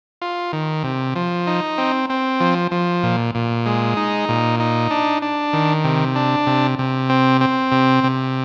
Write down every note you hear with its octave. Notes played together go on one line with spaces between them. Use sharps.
F4
D#3
C3
F3
D#4
C4
C4
F3
F3
A#2
A#2
G#3
D#4
A#2
D#4
D4
D4
D#3
C3
D4
C3
C3
C4
C4
C3
C3